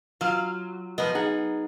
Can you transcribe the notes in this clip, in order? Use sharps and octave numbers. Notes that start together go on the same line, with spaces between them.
F#3 F4 F5
F3 F#3 B3 D#5
D#4 G#4 F#5